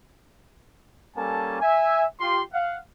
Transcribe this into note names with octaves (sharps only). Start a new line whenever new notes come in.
G3 A#3 C#4 A4 G#5 A5
E5 G#5
F4 G4 C6
F5 F#5